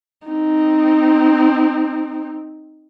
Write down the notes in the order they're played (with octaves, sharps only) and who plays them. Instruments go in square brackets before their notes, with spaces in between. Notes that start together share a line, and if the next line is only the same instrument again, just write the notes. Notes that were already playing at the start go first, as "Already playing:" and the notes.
[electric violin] C4 D#4